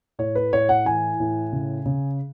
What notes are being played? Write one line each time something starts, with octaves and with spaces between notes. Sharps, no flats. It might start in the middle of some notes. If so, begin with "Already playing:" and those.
A2 C#5
B4
A2 C#5
F#5
E3 G#5
A2
C#3
C#3